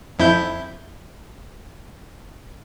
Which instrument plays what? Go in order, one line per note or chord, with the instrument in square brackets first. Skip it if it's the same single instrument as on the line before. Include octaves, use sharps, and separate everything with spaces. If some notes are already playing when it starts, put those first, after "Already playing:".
[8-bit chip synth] F2 E4 G6